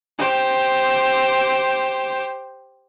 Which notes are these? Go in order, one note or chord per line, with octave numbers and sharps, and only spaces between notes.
G4 C5